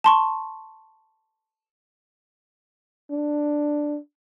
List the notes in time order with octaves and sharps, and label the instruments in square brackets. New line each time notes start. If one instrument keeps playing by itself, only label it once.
[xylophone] A5 C6 C#6
[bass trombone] D4